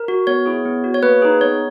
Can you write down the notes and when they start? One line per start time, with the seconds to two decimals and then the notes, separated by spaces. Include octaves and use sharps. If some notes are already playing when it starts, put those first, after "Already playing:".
Already playing: A#4
0.08 F#4
0.27 B3 C#5
0.46 E4 G#4
0.65 B3
0.84 F#4
0.94 C#5
1.03 A#3 B4
1.22 D#4 G#4
1.41 B3 C#5